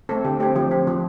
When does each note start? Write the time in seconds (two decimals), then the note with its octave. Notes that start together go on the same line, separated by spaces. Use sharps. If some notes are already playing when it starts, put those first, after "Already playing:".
0.09 A3 C4 A4
0.24 D3 G4
0.40 A3 C4 G4
0.56 F3 G4
0.71 C4
0.87 F3